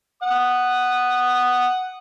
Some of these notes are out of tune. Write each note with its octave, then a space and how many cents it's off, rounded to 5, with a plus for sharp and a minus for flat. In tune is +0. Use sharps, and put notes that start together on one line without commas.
F#5 +5 D#6 -10